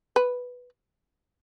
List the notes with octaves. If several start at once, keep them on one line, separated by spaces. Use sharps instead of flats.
B4